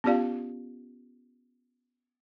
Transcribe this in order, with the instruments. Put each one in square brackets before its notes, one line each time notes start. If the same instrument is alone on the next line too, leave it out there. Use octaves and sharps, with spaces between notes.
[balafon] B3 C#4 F4 G4 D5 F5